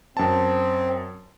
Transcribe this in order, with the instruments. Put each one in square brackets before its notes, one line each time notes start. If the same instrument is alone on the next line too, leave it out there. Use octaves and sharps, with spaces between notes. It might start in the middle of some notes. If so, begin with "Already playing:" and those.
[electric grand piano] F#2 A5 [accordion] C4